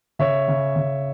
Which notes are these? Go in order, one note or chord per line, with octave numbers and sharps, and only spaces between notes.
C#3 C#5 E5
C#3
C#3